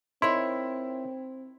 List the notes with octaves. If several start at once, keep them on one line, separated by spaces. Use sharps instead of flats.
C4 D#4 E4 A#4 C#5 C6